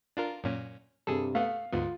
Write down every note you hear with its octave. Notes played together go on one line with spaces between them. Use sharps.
D4 F4 A#4
F#2 A#2 C#4
G2 C3 G#4 A4
A3 B3 F5
D2 G#2 B3 F4